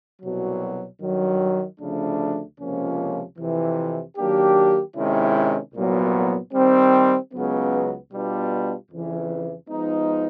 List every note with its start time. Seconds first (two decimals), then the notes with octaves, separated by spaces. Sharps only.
0.22 C2 B2 F#3
1.02 G2 D#3 F#3
1.80 D2 C#3 F3 A3 D4
2.59 C#2 C3 F3 A#3 C#4
3.38 F2 C3 E3
4.17 D#3 F#3 A#3 D4 G4
4.96 C3 D#3 G#3 C#4 E4
5.75 C2 A#2 F#3 B3
6.54 D#3 G3 C4
7.33 C#2 C#3 F#3 B3
8.12 B2 G3 B3 D4 F4
8.91 F2 C#3 E3
9.69 F3 G#3 B3 D#4